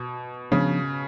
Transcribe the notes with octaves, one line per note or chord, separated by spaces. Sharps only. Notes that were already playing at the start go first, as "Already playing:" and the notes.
Already playing: B2
C#3 F3 B3 D4